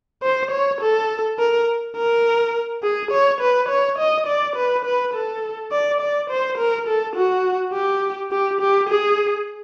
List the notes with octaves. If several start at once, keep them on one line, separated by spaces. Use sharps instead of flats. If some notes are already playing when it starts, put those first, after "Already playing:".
C5
C#5
A4
A#4
A#4
G#4
C#5
B4
C#5
D#5
D5
B4
B4
A4
D5
D5
C5
A#4
A4
F#4
G4
G4
G4
G#4